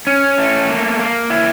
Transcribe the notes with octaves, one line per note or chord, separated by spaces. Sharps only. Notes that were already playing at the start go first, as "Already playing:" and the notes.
C#4
A3
A#3
A#3
E4